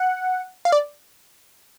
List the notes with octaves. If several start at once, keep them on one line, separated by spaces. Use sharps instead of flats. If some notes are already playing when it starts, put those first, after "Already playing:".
Already playing: F#5
F5
D5